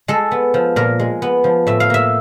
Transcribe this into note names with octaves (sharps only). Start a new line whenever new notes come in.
G#3 A4
B3
F3
A#2 A#4
G#3
B3
F3
A2 E5
F5
A#3 E5